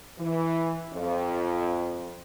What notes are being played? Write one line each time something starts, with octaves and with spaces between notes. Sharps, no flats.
E3
F2